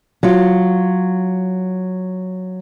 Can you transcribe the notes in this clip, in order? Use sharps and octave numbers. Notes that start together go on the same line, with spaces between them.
F#3 F4